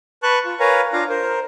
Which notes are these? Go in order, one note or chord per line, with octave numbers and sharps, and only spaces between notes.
B4 A5 C#6 F#6
F4
A#4 B4 C#5 F5 G#5 A#5
D4 F4 F5 A#5
A#4 C5